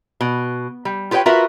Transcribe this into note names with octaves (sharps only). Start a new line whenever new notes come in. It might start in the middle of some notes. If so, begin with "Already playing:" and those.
B2
G3
F4 G4 B4 C#5 G5
F4 F#4 A#4 B4 E5